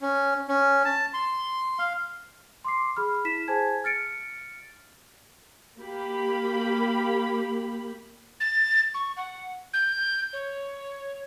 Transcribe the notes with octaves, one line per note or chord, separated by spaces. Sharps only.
C#4
C#4
A5
C6
F5
C6 D6 C7
G#4 B5 F6
E4 B6 E7
G#4 C5 G#5 A5 G#6
F6 A6 C#7 D7
A#3 G4 B5
A6
C#6
F#5
G6
C#5